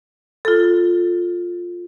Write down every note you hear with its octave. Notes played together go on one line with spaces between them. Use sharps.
F4 A4